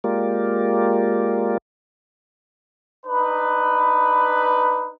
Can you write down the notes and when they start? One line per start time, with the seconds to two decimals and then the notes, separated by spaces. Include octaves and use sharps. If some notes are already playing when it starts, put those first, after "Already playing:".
0.04 G#3 A#3 F4 G4 A#4 D5
3.06 D4 D#4 B4